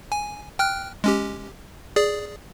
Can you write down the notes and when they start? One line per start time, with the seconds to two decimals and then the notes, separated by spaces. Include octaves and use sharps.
0.12 G#5
0.59 G5 F6 F#6
1.04 G#3 C#4 G4
1.96 G#4 D5